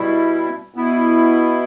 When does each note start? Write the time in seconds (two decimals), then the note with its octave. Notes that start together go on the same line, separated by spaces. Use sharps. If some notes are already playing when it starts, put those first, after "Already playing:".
Already playing: B2 G3 E4
0.74 B2 B3 E4